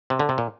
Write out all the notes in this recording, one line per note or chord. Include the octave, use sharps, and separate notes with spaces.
C3
D3
C3
A#2